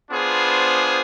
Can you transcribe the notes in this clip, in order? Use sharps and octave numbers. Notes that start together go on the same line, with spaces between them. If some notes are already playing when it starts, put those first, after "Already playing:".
B3 D4 F4 G#4 C5